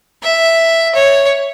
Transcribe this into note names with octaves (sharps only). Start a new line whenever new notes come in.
E5
C#5